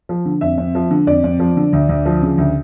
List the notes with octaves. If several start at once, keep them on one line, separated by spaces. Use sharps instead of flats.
F3
D3
F2 E5
F2
F3
D3
F2 D5
F2
F3
D3
D2
D2
F3
C#3
D2